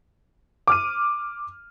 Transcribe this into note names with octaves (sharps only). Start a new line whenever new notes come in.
D6 F6 D#7